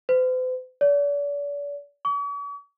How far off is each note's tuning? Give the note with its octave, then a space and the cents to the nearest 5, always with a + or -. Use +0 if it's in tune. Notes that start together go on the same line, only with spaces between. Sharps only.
C5 -45
D5 -40
C#6 +45